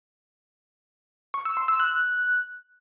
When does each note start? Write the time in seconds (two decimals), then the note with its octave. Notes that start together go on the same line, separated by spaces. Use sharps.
1.34 C#6
1.45 E6
1.57 C6
1.68 E6
1.80 F#6